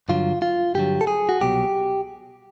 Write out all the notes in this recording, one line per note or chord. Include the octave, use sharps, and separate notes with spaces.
G2 D3 F#3 F4
F4
G2 D3 F#3 G4
A4
G#4
F#4
C2 B2 F#3 G4